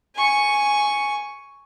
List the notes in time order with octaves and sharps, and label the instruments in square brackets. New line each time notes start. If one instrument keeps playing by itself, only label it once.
[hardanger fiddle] G#5 C#6